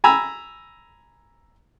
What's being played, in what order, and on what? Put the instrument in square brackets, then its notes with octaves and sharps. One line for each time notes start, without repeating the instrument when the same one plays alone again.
[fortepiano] G#5 A#5 B5 E6